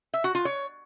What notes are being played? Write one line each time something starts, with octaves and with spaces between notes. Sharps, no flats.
E5
F#4
F4
C#5